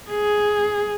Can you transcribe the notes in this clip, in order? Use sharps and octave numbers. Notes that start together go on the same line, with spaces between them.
G#4